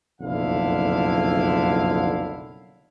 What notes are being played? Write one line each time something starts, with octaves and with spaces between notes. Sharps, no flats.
F#1 B1 F2 D3 E4 F5